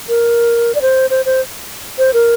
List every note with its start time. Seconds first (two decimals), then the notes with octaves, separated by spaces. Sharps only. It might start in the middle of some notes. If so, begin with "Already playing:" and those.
0.09 A#4
0.75 D5
0.82 C5
1.10 C5
1.26 C5
1.98 C5
2.14 A#4